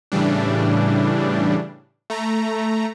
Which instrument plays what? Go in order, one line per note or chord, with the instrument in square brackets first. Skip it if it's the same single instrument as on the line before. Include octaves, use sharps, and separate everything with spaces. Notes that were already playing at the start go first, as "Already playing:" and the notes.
[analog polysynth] A2 C#3 E3 G3 D4
A3 A#5